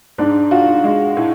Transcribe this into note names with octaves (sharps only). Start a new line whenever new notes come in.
G#2 D4
F4 F#4
G#3
A2